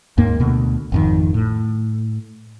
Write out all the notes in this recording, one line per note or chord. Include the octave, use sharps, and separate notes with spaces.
D#2 G#2 A#3
D2 B2
G#1 F2 D#3
A2